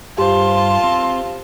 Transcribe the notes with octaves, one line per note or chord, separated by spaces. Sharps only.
G2 F4 G4 C5 A5 C6
C4